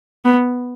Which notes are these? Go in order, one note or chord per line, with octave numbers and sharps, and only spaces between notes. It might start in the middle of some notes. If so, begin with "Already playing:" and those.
B3